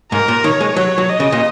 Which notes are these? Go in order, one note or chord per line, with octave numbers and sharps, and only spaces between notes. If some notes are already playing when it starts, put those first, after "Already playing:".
G#2 A#4
A#2
D#3 C#5
G#3
F#3 C#5
F#3
D#5
C#3
A#2